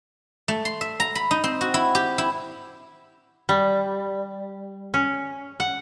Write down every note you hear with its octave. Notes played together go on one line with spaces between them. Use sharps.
A3
C6
E5
A#5
B5
D#4
C4
F#4
E4
G4
E4
G3
C#4
F#5